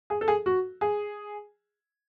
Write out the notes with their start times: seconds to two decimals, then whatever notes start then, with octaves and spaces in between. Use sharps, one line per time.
0.10 G#4
0.21 A4
0.28 G#4
0.46 F#4
0.81 G#4